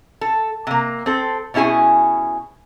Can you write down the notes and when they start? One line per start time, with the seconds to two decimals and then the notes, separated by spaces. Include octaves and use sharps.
0.21 A4
0.67 C3 A#3
1.06 C4 A4
1.54 B2 C#4 E4 G#4 G#5